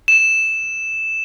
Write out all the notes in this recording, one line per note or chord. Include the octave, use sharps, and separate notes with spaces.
E7